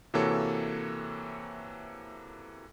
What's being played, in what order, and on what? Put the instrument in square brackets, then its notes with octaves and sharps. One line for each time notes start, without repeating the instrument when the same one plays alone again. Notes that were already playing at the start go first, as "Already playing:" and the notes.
[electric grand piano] C3 E3 A#3 F#4 A4 C#5